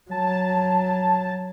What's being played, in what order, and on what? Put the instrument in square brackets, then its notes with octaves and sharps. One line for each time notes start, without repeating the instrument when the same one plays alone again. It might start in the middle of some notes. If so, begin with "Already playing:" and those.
[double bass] F#3 [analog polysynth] A5